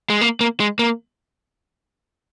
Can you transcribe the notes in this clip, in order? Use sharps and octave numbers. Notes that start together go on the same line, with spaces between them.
G#3
A#3
A#3
G#3
A#3